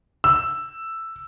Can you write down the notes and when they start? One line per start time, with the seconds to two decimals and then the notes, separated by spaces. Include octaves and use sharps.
0.24 E6